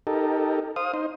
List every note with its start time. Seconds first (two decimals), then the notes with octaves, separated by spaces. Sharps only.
0.07 D#4 G4 A4 A#4
0.76 C5 F5 D#6
0.94 D#4 C5